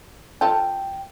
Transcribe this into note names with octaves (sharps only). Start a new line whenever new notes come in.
F3 F4 A4 G5